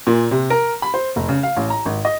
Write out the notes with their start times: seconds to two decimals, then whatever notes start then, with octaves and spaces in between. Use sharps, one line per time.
0.07 A#2
0.31 C3
0.50 A#4
0.82 B5
0.94 C5
1.16 F1
1.29 C#3
1.43 F5
1.57 A1
1.70 A#5
1.85 G#1
2.05 D#5